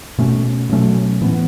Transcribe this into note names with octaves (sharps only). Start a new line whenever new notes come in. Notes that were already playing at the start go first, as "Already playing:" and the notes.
B2 A3 C#4
B2 F#3 A3 C#4
A2 E3 B3